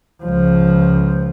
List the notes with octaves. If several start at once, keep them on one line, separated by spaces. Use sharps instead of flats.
C#2 F3